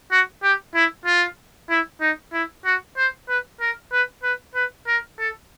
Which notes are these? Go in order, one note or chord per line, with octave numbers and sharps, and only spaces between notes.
F#4
G4
E4
F4
E4
D#4
E4
F#4
C5
B4
A#4
B4
B4
B4
A#4
A4